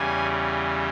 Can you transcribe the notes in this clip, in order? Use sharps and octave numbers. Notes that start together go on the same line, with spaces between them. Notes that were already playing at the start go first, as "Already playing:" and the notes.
Already playing: E2 C#3 E3 G3 G#5